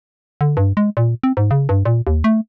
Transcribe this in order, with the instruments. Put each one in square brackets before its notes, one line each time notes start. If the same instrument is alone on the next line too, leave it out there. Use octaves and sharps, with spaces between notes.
[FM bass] D3
G2
G#3
A#2
C4
G#2
C#3
G2
A#2
D#2
A3